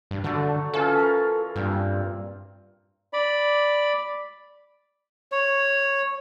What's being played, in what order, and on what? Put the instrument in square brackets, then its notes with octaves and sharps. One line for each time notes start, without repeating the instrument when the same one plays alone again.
[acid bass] G2
[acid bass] D3 [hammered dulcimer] F#3 A3 A4
[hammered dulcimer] E3 C#4 F4 [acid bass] A4
[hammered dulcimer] A#4
[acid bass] G2 [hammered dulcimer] A#2 C4
[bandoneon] D5 B5
[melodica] C#5